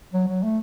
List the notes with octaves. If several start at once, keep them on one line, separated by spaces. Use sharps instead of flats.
F#3
F#3
A3